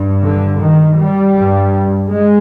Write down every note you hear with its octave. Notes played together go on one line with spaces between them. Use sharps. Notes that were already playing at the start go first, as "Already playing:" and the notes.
Already playing: G2
D3
D#3
G3
G2
G#3